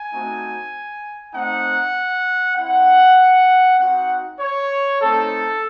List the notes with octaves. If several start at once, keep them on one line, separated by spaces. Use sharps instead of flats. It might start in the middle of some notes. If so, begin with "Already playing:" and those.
Already playing: G#5
A3 C4 D#4 F#4
A3 C4 D#4 F#5
C4 E4 F#5
C4 D#4 F#4 F#5
C#5
A3 C4 D#4 A4